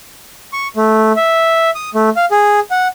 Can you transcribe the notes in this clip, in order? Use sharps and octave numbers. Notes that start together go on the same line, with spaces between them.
C#6
A3
E5
D#6
A3
F5
G#4
F#5